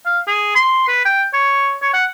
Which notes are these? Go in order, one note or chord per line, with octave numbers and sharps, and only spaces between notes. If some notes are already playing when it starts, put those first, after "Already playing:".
F5
G#4
C6
B4
G5
C#5
C#5
F#5